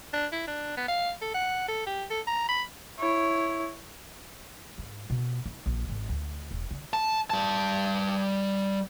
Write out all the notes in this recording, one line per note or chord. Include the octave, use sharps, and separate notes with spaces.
D4
E4
D4
B3
F5
A4
F#5
A4
G4
A4
A#5
B5
E4 C#5
G#2
B2
D#4
A#1
G#1
D2
E1
D3
A5
G3 A5